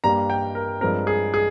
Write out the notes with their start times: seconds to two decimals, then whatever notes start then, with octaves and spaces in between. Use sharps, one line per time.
0.04 G2 G3 A#3 A#5
0.30 G5
0.55 A#4
0.81 G2 F3 G#3 C4 A#4
1.07 G#4
1.34 G#4